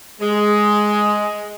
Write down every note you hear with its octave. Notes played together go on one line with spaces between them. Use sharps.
G#3